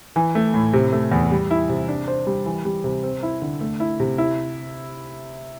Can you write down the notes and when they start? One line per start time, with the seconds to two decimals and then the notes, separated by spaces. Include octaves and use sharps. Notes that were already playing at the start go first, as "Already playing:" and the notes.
0.16 E3
0.35 A3
0.54 A2
0.73 C3
0.93 A3
1.12 E2
1.31 G3
1.51 E4
1.69 C3
1.88 D4
2.08 C5
2.27 G3
2.46 E3
2.65 G3
2.84 C3
3.03 C4
3.23 E4
3.42 D3
3.61 A3
3.80 E4
4.00 C3
4.18 E4